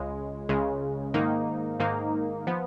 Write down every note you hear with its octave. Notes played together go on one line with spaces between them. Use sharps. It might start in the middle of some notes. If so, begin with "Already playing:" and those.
Already playing: C#2 C#3 G#3
C#2 C#3 G#3
G#2 D#3 A#3 D#4
G#2 D#3 A#3 D#4
F3 B3